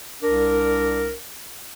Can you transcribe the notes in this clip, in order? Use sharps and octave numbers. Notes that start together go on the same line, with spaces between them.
C2 D4 A#4